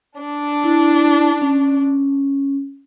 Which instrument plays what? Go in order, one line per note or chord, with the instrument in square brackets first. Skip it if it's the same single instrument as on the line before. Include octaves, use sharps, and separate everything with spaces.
[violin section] D4
[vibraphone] E4
C#4